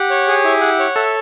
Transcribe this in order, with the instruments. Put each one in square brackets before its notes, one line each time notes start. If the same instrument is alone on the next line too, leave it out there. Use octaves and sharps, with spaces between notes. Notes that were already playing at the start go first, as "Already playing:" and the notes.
Already playing: [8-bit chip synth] G4 [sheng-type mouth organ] F#5
[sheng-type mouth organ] C#5
G#4
E4
F#5
C#5
[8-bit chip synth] A4 [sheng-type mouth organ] E5